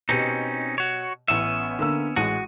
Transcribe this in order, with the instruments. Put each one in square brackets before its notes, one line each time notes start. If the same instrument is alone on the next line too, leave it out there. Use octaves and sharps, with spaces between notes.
[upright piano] B2 G4 [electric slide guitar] C4 C#4 D#4
[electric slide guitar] F#4 C#5
[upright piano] A1 D#7 [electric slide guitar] B3 C#4 E5
[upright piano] D3 A#3 E6
[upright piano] A1 G#3 D#7 [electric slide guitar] F#4